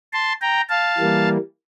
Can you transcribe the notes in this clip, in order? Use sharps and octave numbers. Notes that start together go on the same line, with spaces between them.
A5 C6
G5 A#5
F5 A5
E3 G3 A#3